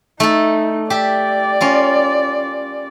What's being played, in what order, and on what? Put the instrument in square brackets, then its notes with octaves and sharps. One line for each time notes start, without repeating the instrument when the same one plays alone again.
[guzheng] A3 A4 [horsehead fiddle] D#4
[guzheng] G4 E5 [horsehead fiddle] D5
[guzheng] C#4 F4 A#4